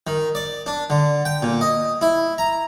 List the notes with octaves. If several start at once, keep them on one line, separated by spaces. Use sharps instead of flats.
D#3
D5
D4
D3
G5
A#2
D#5
E4
A#5